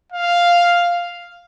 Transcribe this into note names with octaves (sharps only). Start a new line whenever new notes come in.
F5